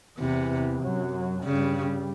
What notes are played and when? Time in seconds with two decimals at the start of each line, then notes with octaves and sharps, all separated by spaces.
0.18 E2 C3 E3
0.81 F#2 F#3
1.44 G2 C#3 G3